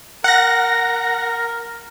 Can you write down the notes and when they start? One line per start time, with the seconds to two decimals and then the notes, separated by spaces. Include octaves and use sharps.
0.24 A#4 F#5 A#6